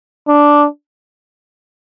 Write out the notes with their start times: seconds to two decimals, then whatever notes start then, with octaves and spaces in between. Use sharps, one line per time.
0.28 D4